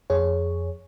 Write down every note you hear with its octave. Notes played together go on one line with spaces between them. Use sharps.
F2 G#4 C#5